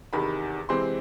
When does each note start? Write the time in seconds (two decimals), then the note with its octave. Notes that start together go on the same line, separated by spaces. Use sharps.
0.13 E2 C3 D#3 B5
0.69 C3 E3 G#3 C4 C6